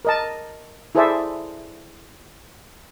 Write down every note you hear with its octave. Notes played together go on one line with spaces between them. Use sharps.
A#4 D#5 A5
E4 G#4 A4 C5 D5 E5